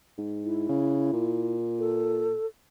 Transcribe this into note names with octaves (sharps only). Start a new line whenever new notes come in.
G#2
E4
C#3
A#2
A4